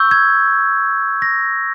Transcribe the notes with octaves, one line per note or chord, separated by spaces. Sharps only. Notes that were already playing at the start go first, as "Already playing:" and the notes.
Already playing: C#6 E6 G6
G#6
A#6